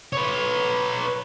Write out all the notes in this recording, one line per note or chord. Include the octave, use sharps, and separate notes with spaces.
B4 C#5